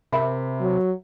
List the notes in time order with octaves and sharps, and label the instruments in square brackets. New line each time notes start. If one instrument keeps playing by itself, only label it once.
[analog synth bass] C3 [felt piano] A#4 E5 B5
[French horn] F#3